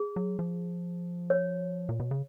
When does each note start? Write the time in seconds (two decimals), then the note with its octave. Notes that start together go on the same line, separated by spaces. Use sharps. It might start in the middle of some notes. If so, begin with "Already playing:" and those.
Already playing: G#4
0.16 F#3
0.39 F3
1.30 C#5
1.89 A#2
2.00 B2
2.11 C#3